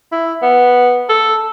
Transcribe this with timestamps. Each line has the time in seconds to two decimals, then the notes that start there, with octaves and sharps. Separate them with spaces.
0.12 E4
0.42 B3
1.09 A4